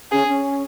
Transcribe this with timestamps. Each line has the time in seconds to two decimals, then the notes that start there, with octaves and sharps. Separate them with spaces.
0.12 C#4 G#4
0.28 C#4